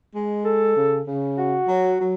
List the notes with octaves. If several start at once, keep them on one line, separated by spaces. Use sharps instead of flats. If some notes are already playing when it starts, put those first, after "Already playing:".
G#3
A4
C#3
C#3
F#4
F#3
F#3